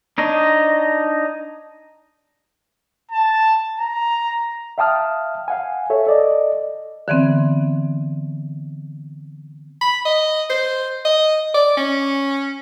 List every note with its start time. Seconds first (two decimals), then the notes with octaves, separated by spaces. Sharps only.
0.18 D4 D#4 C#5 D#5
3.11 A5
3.79 A#5
4.78 E5 F5 G5 A5 D#6 F6
5.48 F5 F#5 G#5
5.90 A4 C#5 E5
6.06 A4 D5 D#5
7.08 D3 E3 B3 C4
9.81 B5
10.05 D#5
10.50 C5
11.05 D#5
11.54 D5
11.77 C#4